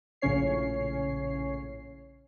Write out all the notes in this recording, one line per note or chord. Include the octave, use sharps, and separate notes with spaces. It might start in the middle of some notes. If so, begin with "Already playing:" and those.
A#1 A2 C#3 C#4 C#5 C7